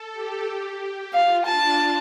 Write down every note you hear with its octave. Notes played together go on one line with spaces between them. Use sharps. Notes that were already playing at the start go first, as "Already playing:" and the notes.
Already playing: A4
G4
F4 F5
D4 A5